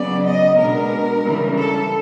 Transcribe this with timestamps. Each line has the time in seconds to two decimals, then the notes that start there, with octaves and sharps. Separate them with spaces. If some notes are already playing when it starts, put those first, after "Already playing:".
Already playing: C#3 F#3 B3 D5
0.24 D#5
0.57 B2 G#3 B3 D4 A#4
1.23 C#3 E3 G3
1.55 A4